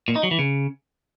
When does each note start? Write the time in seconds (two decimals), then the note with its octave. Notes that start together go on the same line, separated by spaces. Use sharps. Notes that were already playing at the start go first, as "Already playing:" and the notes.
0.08 A#2
0.16 D#4
0.23 F#3
0.31 E3
0.39 C#3